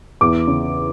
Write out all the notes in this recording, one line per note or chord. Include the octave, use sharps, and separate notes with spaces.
E2 D6
C#3